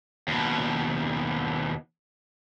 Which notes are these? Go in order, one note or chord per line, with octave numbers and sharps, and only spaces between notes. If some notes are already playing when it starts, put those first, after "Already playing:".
D#2 B2